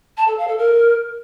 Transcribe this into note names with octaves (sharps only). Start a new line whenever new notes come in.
A5
A4
F5
A4
A#4